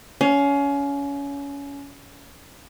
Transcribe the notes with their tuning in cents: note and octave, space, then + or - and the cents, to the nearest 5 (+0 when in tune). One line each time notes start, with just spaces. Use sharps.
C#4 +25 F5 +0